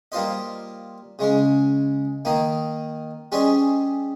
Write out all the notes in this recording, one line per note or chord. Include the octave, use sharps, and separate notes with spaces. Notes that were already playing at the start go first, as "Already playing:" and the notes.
G3 A#3 F4 C5 D#5
C#3 G#3 C#4
D#3 A#3 D#4
G3 C#4 G#4 C5 D#5